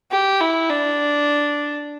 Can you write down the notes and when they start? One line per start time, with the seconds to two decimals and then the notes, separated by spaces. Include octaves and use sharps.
0.11 G4
0.41 E4
0.70 D4